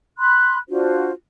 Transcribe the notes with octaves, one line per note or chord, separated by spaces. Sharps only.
B5 C6 F#6
D4 F4 F#4 C5